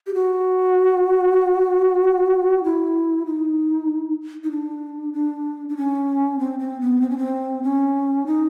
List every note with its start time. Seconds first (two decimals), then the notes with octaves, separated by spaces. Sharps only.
0.07 G4
0.14 F#4
2.64 E4
3.26 D#4
4.44 D#4
4.51 D4
5.13 D4
5.69 D4
5.77 C#4
6.39 C4
6.59 C4
6.81 B3
7.02 C4
7.10 C#4
7.18 C4
7.63 C#4
8.26 D#4